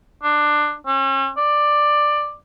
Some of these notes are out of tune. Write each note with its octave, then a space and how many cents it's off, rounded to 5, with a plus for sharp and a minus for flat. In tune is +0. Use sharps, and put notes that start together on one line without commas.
D4 +15
C#4 -40
D5 +10